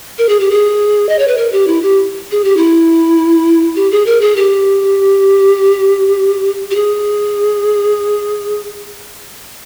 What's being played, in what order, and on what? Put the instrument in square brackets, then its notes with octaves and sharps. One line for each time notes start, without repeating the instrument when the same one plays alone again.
[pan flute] A#4
G#4
G4
G#4
D#5
C#5
B4
A#4
G4
E4
G4
G#4
G4
E4
G4
G#4
A#4
G#4
G4
G4
G#4